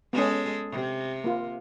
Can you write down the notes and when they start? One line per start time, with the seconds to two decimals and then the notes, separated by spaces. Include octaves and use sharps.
0.13 G#3 B3 C#4 G#4 A4
0.71 C3
1.24 A#3 F4